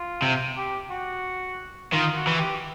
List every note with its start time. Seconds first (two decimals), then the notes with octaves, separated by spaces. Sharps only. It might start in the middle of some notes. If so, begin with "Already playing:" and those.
Already playing: F4
0.22 C3
0.56 G4
0.90 F#4
1.92 D#3 F4
2.15 F#4
2.27 E3
2.38 G4